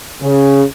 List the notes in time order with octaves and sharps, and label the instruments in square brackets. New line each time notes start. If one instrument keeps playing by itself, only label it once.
[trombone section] C#3